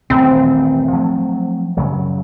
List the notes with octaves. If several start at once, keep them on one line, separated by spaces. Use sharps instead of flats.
D#1 A1 D#3 C4
F3 F#3 A3
F#2 C#3 F#3